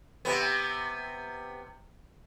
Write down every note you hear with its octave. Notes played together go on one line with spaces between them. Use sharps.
C3 B3